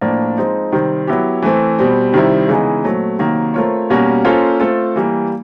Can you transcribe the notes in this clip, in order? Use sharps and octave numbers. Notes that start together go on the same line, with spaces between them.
A2 F3 A#3 D4
F3 G#3 C4 D#4
C3 D#3 G3 C4
F#3 B3 E4 G4
E3 A3 C4
B2 G3 C4
C3 D#3 G3 C4 E4
C#3 E3 G#3 B3 D#4
A#2 F#3 A3 C4
C3 D#3 F#3 A#3
A3 C4 F4 A#4 C#5
B2 G3 A#3 C#4 F#4
A#3 C#4 F4 A4 C5
A3 C4 F4 A4
E3 G3 A#3